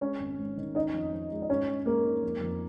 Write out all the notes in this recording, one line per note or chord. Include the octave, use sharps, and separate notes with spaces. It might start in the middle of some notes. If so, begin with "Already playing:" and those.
G#3 C#4 C#5
G#1
G#2
D#3
C#4 D#4 D#5
F2
F3
G#3
D#5
G#2 C#4 C#5
G#2
G#3 A#3 A#4
D#4
F2
F2